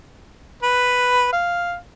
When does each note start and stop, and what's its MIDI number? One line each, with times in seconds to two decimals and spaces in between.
0.63 1.29 71
1.33 1.75 77